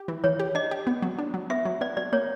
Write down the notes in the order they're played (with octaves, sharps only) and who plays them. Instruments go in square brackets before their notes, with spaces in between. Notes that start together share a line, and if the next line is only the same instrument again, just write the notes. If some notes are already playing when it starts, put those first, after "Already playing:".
Already playing: [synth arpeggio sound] G4
E3
[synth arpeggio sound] E3 [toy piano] C#5
[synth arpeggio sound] G4
[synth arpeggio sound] D4 [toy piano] D#5
[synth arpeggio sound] G4
B3
F#3
D4
F#3
[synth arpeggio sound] B3 [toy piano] E5
[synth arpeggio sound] F#3
[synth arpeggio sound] B3 [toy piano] D5
[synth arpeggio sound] F#3 [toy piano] D5
[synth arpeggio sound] A#3 [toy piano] C#5